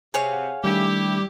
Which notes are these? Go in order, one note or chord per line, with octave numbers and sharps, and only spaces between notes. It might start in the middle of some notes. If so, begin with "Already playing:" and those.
C3 G#4 C#5 F5
F#5
D#3 G3 A3 D4 E4 G4